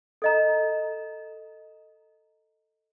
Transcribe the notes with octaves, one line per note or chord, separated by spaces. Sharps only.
A4 D#5 A#5